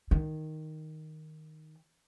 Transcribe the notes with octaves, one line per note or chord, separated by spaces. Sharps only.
D#3